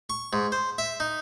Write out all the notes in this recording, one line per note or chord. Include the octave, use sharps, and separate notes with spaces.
C#6
G#2
C5
E5
D#4